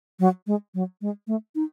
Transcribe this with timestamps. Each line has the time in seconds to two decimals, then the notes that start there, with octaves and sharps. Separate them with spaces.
0.20 F#3
0.47 G#3
0.74 F#3
1.01 G#3
1.27 A3
1.55 D#4